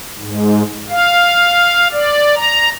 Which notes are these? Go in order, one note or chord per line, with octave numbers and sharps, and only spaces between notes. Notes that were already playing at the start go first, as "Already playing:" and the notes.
G#2
F5
D5
A#5